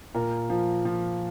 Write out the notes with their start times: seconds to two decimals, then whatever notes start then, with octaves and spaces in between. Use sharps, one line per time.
0.15 A#2 A#4
0.50 F3
0.85 F3